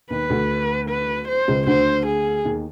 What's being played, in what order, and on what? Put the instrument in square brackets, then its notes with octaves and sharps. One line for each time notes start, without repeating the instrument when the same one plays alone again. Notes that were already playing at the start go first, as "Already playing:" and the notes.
[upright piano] D#2 D#3 [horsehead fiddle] B4
[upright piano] D2 D3
[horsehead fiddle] B4
C5
[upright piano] C#2 C#3
[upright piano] D2 D3 [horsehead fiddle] C5
[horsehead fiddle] G#4
[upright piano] D#2 D#3